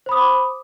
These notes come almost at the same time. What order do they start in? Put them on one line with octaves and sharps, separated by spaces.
C5 B5 D#6 D6